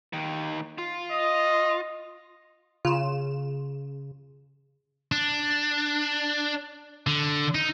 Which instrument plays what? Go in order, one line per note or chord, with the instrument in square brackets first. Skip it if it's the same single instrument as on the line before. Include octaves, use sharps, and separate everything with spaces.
[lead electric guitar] D#2 D#3
F4
[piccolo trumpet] D#5
[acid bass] C#3 [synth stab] F4 E7
[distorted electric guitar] D4
D3
D#4